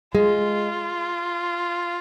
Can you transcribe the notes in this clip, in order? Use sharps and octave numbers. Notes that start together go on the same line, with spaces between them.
G#3 F4